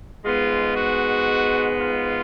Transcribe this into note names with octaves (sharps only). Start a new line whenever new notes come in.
G#2 G#3 B3 F4
F#4
F4